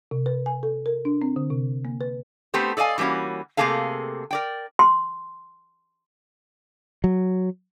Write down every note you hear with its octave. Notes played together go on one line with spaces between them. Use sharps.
C3
B4
G#5
A4
A#4
D4
C4
D3
C3
A#3
B4
A3 B3 C4 G4 C5
A4 D5 D#5 F5 G#5
E3 G3 A#3 C#4 F#4
C3 A3 A#3 G#4 A4 F5
A#4 D5 G5
C6
F#3